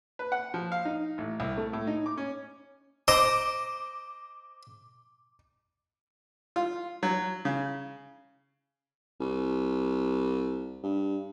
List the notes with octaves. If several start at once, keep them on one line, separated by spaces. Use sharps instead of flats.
B4
F#5
F3
F5
D#4
A1
C2
A3
A2
D#4
D6
C#4
C5 D#5 A#5 D6
F4
F#3
C#3
C2
G2